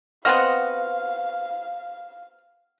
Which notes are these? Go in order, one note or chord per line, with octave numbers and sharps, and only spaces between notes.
B3 C4 F#4 D#5 F5 F#5 F6